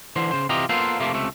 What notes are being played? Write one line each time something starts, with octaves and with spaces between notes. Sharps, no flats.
D3 E3 C5
C#3 C5
C3 E3 F4 G4 D#5 A#5
A#3 B3 F4 A4 A#4 C5
C3 F3 A3 A#3
C#2 C3 A3